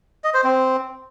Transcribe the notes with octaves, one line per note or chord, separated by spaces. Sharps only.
D#5
C5
C4